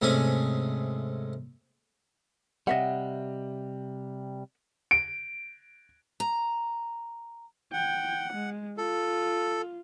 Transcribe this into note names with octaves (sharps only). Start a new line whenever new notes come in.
G#2 C3 A3 C#4 G#4 G#5
C3 G3 D#5 E5 F#5
D7
A#5
F#5 G5
G#3
F4 A4